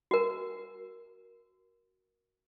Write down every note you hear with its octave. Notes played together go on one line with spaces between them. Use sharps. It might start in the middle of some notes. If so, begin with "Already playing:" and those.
F#4 A#4